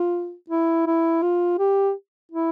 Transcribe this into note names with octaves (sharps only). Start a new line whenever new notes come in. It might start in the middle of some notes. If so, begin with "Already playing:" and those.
Already playing: F4
E4
E4
F4
G4
E4